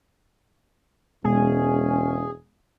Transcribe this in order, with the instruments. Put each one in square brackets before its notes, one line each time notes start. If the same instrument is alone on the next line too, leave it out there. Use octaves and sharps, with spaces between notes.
[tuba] E1 [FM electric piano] B2 G#3 B3 [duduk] C#4 [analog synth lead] G#4